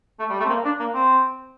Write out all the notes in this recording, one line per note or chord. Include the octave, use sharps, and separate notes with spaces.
A3
G3
A3
C4
A#3
D4
A#3
C4